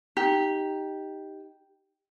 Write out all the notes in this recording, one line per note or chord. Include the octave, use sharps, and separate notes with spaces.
D#4 G4